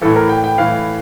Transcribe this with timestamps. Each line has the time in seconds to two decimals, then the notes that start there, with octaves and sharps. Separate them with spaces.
0.01 A2 E3 A4
0.16 A#4
0.29 G5
0.44 G5
0.58 A2 E3 F5